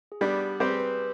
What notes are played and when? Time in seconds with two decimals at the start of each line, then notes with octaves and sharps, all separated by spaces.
0.12 G#4
0.21 G3 B3 D4 G4
0.60 G3 C4 G4 B4 C5
0.70 G#4
0.79 B4